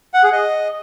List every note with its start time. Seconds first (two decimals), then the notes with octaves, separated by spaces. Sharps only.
0.14 F#5
0.23 G#4
0.32 D#5